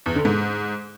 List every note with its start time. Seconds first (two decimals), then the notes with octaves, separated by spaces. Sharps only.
0.06 E2
0.15 D3
0.25 G#2